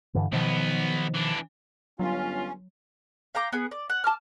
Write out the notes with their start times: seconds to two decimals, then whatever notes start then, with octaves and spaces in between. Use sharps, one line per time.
0.14 G2 D3 E3
0.32 B1 B2 D#3 F3 B3
1.14 E3 D4
1.99 G1 F#3 C#4 F4
3.35 F5 G5 A#5 D6
3.52 B3 G#4
3.71 D5
3.90 F#5
4.04 A5 D6 F6